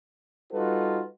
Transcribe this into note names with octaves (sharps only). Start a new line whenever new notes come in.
G3 D#4 F4 F#4 A4 B4